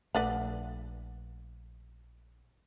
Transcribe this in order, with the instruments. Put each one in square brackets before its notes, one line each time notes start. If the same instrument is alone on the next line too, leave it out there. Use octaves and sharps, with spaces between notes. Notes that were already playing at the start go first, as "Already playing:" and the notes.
[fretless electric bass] A#1 A3 [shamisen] B4 D5 F#5